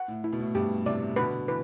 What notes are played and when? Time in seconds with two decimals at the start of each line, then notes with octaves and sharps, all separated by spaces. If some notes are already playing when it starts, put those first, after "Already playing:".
Already playing: F#5
0.08 A2
0.24 E4
0.32 B2
0.40 A2
0.55 G2 B2 G4
0.86 A2 C3 D5
1.16 B2 D3 B4
1.47 E3 B4